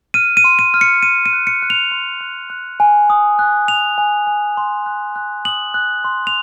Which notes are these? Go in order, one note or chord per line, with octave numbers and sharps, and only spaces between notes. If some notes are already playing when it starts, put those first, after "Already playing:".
F6 D#7
D#7
C6
D#7
F6
C#7
C6 D#7
D#7
F#6
C#7
F#6
F7
C6
F#6
F#6
G#5
D#6
F#6
G#5 F7
G#5
G#5
C6
F#6
F#6
D#6 F#7
F#6
C6
F7